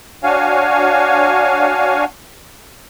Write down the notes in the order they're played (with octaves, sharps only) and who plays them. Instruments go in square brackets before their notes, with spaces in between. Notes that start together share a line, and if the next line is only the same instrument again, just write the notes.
[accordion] D4 F#4 C#5 F5 G#5